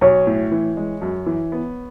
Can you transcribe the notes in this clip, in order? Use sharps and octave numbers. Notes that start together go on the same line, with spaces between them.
B1 C#5
A2
E3
G#3
F#2
E3
B3